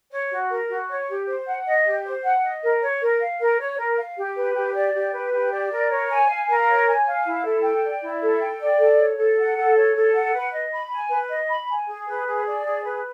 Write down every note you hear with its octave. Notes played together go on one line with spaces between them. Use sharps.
C#5
F#4
A#4
F#4
C#5
G4
C5
F#5
D#5
G4
C5
F#5
D#5
A#4
C#5
A#4
F5
A#4
C#5
A#4
F5
G4
B4
G4
D5
G4
B4
G4
D5
A#4
C#5
G#5
F5
A#4
C#5
G#5
F5
E4
A4
G5
D5
E4
A4
G5
D5
A4
C#5
A4
F#5
A4
C#5
A4
F#5
B4
D#5
B5
G#5
B4
D#5
B5
G#5
G#4
B4
G#4
D5
G#4
B4